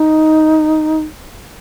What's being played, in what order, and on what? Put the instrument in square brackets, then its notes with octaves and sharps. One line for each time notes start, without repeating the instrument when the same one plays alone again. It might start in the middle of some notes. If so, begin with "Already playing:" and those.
Already playing: [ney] D#4